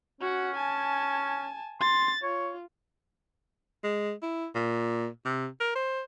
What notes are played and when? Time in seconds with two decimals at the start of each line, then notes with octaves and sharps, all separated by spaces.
0.21 C#4 F#4 F#5
0.56 G#5 A5
1.81 C6 A6
2.23 F4 C#5
3.83 G#3
4.22 E4
4.55 A#2
5.25 C3
5.60 A#4
5.75 C5